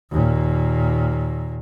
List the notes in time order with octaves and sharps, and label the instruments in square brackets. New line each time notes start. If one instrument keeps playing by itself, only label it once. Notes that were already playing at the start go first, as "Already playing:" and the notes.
[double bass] D#2 A#2